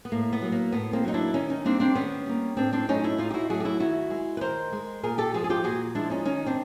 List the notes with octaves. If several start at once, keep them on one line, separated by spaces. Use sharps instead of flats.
B3
A2 A#3
B3
F#3 A#3
A#3
A2 B3
A#3 C4
F#3 A#3 D#4
D4 E4
D#3 C#4 D#4
C#4 D#4
G3 A#3 C4 D4
C4 D4
D#3 B3 C#4
G3 A#3
A2 C4 D4
C4 D4
F#3 A3 C#4 D#4
D4 E4
A2 D#4 F4
G4
E4 F#4
F#3 A3 F#4 G#4
G4
E4 F#4
D#3 E4 F#4
G#3
B4
D#3 A#4 C5
G#3
A#2 G#4 A#4
G4 A4
F3 G#3 F#4 G#4
G#4
F4 G4
A#2 F#4 G#4
F3 G#3 D4 E4
C#4 D#4
D#3 C#4 D#4
C4 D4